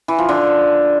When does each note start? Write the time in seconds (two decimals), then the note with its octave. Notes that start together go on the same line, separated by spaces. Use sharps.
0.08 E3
0.18 F3
0.29 D3